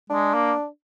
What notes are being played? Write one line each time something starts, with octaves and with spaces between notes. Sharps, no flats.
G#3 D4
A#3